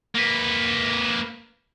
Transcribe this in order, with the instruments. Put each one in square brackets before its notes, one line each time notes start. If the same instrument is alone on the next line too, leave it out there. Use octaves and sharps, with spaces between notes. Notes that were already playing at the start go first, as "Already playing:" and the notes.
[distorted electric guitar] A#3 B4